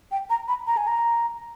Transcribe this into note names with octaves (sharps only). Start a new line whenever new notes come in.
G5
A#5
B5
A#5
G#5
A#5